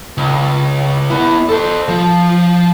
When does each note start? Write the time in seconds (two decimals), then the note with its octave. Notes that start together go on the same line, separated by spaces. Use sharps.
0.18 C#2
1.10 B3 E4
1.49 A4 C5
1.89 F3